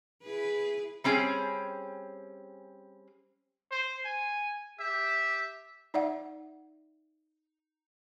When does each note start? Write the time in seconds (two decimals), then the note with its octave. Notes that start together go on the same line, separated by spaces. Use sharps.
0.24 E4 G#4 B4
1.04 G3 C4 C#4 G#4
3.71 C5
4.05 G#5
4.80 G4 E5
5.94 D#4 D5 E5 F#5